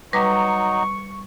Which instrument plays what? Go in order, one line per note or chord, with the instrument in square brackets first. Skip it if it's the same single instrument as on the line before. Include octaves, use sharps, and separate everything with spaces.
[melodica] F#3 D#4 [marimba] G3 B4 D6 [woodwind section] C#6